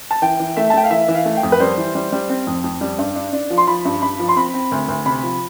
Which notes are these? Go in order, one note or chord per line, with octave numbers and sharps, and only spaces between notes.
A5
E3 G5
E3
A3 E5
A5
A3 G5
F5
E3 E5
E3
F5
A3
G5
F2
B4
G3 C5
E3
G3
G3
C4
F2
F2
G3
G2
D4
D4
F3
C6
F3 B5
G2
G2 B5
F3
C6
C4 B5
C4
D2
D2
C3 B5
F3